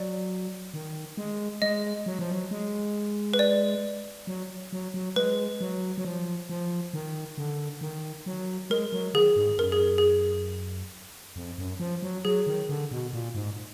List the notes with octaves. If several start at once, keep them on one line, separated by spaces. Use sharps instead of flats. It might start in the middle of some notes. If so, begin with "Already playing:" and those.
Already playing: F#3 D5
D#3
G#3
G#3 D#5
F#3
F3
F#3
G#3
B4
D5
F#3
F#3
F#3
G#3 B4
F#3
F#3
F3
F3
D#3
D3
D#3
F#3
G#3 A#4
F#3
D#3 G#4
G#2
F#2 A#4
G#4
G#4
F2
F#2
F3
F#3
F#3 G#4
D#3
D3
B2
A#2
G#2